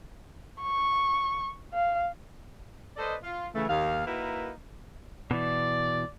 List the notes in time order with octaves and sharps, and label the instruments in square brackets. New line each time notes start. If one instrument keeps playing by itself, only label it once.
[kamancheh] C#6
F5
[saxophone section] A4 B4 C5 D5 D#5
F4
C#3 E3 A3
D#2 F5
A#3 D#4 E4 F#4 A#4 B4
[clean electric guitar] B2 E3 [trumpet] D5